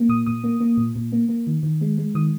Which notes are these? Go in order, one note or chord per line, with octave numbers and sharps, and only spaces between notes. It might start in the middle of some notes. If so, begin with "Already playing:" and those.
Already playing: A#3
A#2 D#6
A#2 D#6
A#3
A#3
A#2
A#2
A#3
A#3
D#3
D#3
G#3
G#3
D#3 D#6